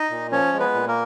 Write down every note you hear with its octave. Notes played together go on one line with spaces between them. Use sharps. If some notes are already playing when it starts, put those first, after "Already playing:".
Already playing: D#4 D#5
A#2
F3 C#4 C#5
G#3
B3 B4
A#2
A#3 A#4